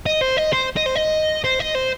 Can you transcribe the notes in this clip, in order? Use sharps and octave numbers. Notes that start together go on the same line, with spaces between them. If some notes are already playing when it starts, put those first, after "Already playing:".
D#5
C5
D#5
C5
D#5
C5
D#5
C5
D#5
C5